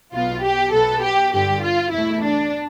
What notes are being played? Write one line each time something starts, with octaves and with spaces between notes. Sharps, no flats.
B1 B2 B3 F4
G4
B1 B2 B3 A4
G4
G1 G2 D3 G4
F4
E2 B2 A3 E4
D4